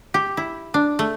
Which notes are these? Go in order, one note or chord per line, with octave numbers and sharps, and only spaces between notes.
G4
E4
D4
A3